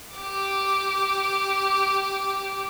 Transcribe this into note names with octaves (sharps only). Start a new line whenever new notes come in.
G4 D6